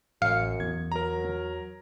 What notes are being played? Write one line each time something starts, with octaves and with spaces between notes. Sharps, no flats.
A1 F#2 F5 C#7
E2 G#6
F#3 A#4 A#5